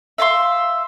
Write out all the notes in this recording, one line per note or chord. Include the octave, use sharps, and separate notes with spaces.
E5 F5 G#5 C6